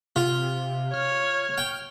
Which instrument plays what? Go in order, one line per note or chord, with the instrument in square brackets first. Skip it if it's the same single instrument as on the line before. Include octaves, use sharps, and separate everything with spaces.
[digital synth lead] C3 [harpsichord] F4
[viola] C#5 [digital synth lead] F6
[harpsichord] G5